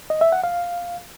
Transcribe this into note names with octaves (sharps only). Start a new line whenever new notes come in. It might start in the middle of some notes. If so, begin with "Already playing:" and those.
D#5
E5
F#5
F5